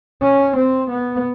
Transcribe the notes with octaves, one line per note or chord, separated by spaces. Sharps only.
C#4
C4
B3